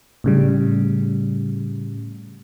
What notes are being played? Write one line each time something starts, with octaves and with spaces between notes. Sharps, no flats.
A2 C#3 G3